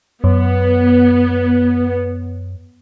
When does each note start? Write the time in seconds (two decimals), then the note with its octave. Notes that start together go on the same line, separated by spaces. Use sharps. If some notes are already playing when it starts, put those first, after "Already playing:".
0.24 F#2 B3